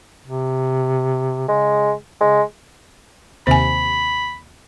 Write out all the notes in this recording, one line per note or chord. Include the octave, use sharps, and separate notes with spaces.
C3
C#3 G#3
C#3 G#3
D#2 C3 C5 G#5 B5